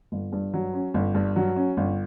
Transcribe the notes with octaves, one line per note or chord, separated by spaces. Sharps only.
G1
G2
F#3
C#4
G1
G2
F#3
C#4
G1